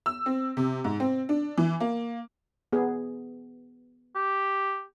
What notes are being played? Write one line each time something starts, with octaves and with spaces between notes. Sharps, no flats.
E6
C4
C3
G#2
C4
D4
E3
A#3
B3 G#4
G4